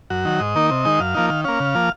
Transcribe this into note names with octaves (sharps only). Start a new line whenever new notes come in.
F#2 F#4
D#3 F#3
G#2 D#5
D#3 A#3 D#4
C3 D#5
D#3 G#3 D#4
F#2 F5
F3 A#3 D#4
D#3 F5
A#3 C#4 F5
C#3
F3 A#3